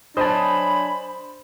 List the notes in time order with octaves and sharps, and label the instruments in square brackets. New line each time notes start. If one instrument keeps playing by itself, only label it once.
[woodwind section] F#3 G#5 B5 [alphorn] D4 [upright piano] C5 [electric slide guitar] D#5 A5